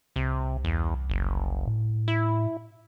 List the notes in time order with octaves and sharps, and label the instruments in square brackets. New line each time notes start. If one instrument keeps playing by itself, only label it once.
[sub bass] C2 [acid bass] C3
[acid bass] E2
F#1
[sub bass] A2
[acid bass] E4